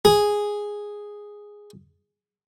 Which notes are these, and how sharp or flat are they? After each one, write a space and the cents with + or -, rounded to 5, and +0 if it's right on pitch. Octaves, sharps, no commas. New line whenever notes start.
G#4 -5